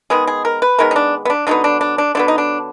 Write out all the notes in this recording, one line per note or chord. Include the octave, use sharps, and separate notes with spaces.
D#3 G#3 B3 G#4
G#4
A#4
B4
D#3 G#3 B3 A#4
D#4
D4
B3
D4
D3 F#3 B3 D#4
D4
D4
D4
D3 F#3 B3 D4
D#4
D4